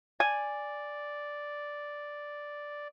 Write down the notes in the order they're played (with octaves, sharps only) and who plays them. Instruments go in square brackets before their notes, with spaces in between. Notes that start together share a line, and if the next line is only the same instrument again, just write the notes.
[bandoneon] D5 [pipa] G#5